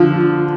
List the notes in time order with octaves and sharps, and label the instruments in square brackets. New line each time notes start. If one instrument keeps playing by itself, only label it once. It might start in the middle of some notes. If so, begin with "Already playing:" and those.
Already playing: [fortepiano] D3 F3